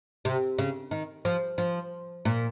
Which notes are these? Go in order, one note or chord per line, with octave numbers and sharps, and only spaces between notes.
C3
C#3
D#3
F3
F3
A#2